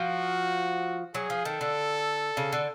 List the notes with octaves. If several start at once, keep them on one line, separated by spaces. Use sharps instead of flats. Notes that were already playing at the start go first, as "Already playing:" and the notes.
Already playing: F3 F#4
F#3 G#4
F3
D#3 A4
D3
C#3
D3